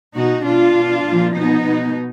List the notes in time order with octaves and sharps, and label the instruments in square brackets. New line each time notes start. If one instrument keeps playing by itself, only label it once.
[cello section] B2 D#4 F#4
B2 D4 F4
B2
A#2 F3
B2 B3 D#4
B2